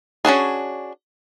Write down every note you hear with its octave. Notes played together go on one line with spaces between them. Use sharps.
C#4 D4 F#4 G#4